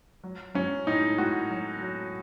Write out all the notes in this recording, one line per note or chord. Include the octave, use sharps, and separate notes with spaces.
F#3
F#3 C#4
A2 D#4
A2 F#4
F#3
F#3